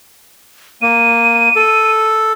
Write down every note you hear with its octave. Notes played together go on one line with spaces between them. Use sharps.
A#3 D#7
A4